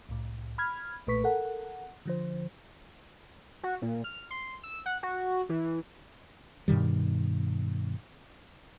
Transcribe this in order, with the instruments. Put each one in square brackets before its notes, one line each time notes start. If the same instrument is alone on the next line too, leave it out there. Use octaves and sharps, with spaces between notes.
[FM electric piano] C2 A2
B5 F6 G#6
B1 A#2 A3 B4 C#6 B6
A4 A#4 F#5
D3 F3 C5
[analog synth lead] F#4
A#2
F6
C6
E6
F#5
F#4
E3
[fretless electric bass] G2 B2 D#3 G3